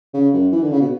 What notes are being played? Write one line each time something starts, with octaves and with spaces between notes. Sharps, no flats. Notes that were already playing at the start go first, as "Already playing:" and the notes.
C#3
F#2
E3
D3
C#3
B2